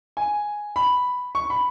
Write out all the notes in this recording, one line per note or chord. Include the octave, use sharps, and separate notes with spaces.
G#5
B5
C#6
B5